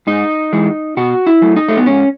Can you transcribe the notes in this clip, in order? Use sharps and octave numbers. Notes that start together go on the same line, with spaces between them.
G#2 D#4
E3 G#3
B2 F#4
E4
F#3 A3
D#4
A3
B3
G#2 C#4